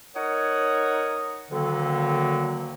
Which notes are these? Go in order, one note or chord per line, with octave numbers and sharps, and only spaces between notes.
D#4 A#4 C#5 F#5 D#6
D2 D3 D#3 F#3 A#3